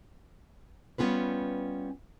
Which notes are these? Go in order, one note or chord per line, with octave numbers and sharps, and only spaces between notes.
G3 B3 C#4 F4 B4